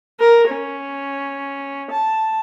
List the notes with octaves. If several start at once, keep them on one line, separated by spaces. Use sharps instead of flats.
A#4
C#4
A5